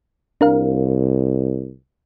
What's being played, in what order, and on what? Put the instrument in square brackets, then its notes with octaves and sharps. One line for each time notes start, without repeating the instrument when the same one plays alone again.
[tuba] C2 [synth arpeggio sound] D4 A#4 F5